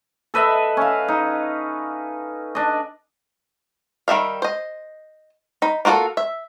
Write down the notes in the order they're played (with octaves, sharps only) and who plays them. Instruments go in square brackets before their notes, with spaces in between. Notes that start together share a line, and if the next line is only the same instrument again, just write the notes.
[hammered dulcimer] A4 B4 D#5 E5
C#4 F5
D#4
D4 D#5
[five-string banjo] D#3 G3 E5 F5
C5 D#5
D#4 B5
A#3 F4 F#4 G#4 A4
E5